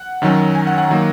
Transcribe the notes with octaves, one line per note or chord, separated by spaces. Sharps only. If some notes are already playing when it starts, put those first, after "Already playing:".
Already playing: F#5
F#2 D#3 F#3 C#4
G#5
F#5
F#5
D#3 F#3 A#3 F#5